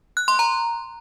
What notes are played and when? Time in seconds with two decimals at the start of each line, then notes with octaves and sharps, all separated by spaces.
0.17 F#6
0.28 C6
0.39 A#5